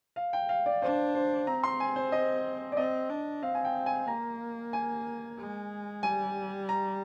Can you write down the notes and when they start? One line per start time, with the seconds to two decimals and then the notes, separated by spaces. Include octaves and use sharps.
0.16 F5
0.33 G5
0.49 F5
0.66 D5
0.82 D4 C5
1.15 C5
1.47 C4 A#5
1.64 C6
1.80 G#5
1.96 C5
2.12 D#5
2.72 D5
2.77 C4 D#5
3.10 D4
3.42 C4 F5
3.55 G#5
3.65 G5
3.86 G#5
4.08 A#3 A#5
4.73 G#5
5.38 G#3
6.03 G3 G#5
6.69 A#5